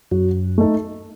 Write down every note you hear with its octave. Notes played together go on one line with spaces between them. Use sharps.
F#2 F#3
A3 D#4 A4